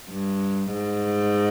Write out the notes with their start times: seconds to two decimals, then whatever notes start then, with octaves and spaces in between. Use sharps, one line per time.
0.10 G2
0.73 G#2